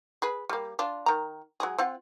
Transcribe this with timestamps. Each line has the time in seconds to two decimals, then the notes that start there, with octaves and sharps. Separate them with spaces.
0.22 G#4 B4
0.49 G3 A#3
0.79 D4 F4
1.06 D#3 A#5
1.60 F#3 G#3 G#4
1.78 C4 F4 F#5